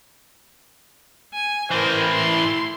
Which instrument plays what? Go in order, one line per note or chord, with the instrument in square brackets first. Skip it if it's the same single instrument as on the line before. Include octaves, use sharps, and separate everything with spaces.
[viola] G#5
[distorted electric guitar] A2 E3 [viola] A#4 C5
[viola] E4 C6